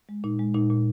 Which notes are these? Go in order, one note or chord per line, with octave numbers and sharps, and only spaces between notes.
G#3
A#2 D#4
G#3
A#2 D#4
A#2